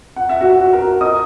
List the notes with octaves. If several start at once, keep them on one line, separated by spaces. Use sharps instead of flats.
F#5
E5
F#4 F#5
F#4 F#5
A#4 A#5
D#5 D#6